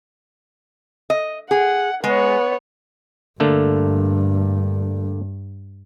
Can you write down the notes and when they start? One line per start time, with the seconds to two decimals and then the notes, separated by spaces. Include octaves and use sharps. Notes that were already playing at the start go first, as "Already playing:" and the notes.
1.10 D#5
1.51 G#4 F#5
2.04 G#3 B3 C#5
3.40 G2 D3 A3 A#3